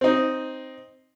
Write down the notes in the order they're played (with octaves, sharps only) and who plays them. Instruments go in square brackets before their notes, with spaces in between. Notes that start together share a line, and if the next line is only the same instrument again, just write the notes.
[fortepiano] C4 D#4